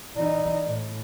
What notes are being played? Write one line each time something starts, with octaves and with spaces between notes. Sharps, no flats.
E3 D#4 D5
A2